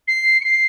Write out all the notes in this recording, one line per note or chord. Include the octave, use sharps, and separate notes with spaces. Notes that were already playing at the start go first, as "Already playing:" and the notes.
C7
C#7
C7